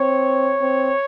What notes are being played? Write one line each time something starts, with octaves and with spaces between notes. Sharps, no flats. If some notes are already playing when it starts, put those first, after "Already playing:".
Already playing: C4 C#5
C4